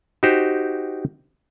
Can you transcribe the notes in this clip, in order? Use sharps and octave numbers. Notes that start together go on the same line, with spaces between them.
D#4 F#4 G4 C5